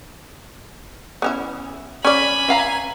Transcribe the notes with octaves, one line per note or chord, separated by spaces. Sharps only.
B3 C#4 E4
C#4 D5 G#5 B5
E5 F5 A#5